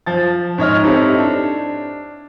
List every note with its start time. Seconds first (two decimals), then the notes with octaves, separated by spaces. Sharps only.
0.06 F3 A6
0.58 G#2 C#5 D#5 F6
0.84 C4 D#4 E4 G4 A4 C#5
1.18 D4